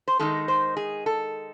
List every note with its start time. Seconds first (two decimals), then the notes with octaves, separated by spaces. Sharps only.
0.08 C5
0.19 D#3 G#3 D#4 A4
0.48 C5
0.77 G#4
1.06 A4